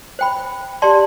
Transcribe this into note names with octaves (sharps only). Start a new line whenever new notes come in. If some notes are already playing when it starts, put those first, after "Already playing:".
C5 G5 B5
G4 D5 A5 C6